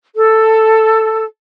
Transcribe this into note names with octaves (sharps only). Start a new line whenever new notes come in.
A4